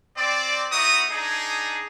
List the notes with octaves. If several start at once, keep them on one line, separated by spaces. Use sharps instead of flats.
C4 D5
B3 D#4 E4 F#4 D#6
D4 D#4 G#4